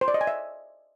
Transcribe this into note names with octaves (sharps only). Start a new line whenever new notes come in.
C5
D5
D#5
G#5
E5